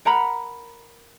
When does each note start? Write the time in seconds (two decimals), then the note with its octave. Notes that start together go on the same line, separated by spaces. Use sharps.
0.05 A#4 F#5 A#5 B5